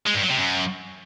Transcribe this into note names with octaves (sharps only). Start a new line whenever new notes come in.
G#3
G2
F#3
C3
F#2